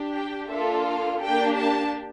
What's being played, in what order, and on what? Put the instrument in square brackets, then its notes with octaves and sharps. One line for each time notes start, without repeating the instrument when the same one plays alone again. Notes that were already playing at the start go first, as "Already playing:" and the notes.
Already playing: [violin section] D4 G4
G5
A#3 D4 F4 A4 E5
F5
A#3 D4 G4 G5
A5